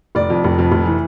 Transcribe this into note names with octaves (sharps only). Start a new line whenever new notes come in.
F1 D5
F2
F1
F2
F1
E3